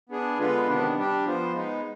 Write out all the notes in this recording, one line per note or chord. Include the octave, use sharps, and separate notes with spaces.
B3 D4 G#4
D3 G#3 B3 F4 B4
C3 D#3 B3 D4
G3 D4 G4
F3 B3 F4 C5
G#3 B3 D#4